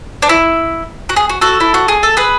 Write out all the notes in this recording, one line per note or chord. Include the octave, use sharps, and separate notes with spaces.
D4
E4
F#4
G#4
F#4
F#4 A4
E4
F#4
G#4
A4
G#4 B4